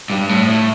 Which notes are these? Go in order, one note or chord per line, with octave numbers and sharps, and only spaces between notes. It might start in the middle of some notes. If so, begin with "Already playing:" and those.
G2
A2
A2